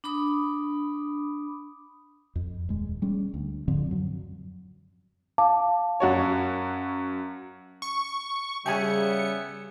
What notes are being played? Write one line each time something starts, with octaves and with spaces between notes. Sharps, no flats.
D4 B5 D6 D#6
F2
D#1 G#3
G3 G#3 C#4
D2
A2 D3 F3 C4
F#2 F#3
F5 A5 D6
F#2 F#4 C#5
C#6
C#3 G3 B3 G4 G#4 E5 G#5 C#7